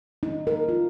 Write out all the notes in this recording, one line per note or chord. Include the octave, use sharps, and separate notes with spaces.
D#4
A#4
F4